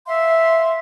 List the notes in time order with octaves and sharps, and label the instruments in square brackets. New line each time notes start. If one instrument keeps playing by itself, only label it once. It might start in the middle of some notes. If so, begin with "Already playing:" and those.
[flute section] E5 F5 C6